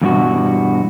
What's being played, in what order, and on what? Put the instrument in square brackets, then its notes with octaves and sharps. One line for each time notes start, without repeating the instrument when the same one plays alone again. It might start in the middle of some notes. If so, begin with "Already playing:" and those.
[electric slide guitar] E2 G2 B2 F#4